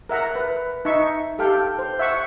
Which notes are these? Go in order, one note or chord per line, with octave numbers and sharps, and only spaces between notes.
A#4 E5 F#5 A#5
B4
D#4 E5 C#6
G4 A4 F5 G5
C5
E5 F#5 C#6